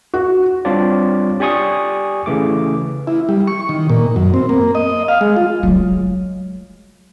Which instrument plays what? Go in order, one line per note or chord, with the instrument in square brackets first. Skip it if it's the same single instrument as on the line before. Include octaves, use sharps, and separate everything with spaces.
[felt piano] F#4
[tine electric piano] G3 C4 D4 F4 C#5 D5
G4 D5 G#5 C#6 D#6
C#3 E3 A3 D6
[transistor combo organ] E4
G3
C#6
D#3
A#2
F#2
C4
A#3
D#5
F5
G#3
F4
[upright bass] F#3 G#3